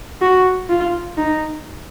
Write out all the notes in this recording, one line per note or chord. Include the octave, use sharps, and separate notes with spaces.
F#4
F4
D#4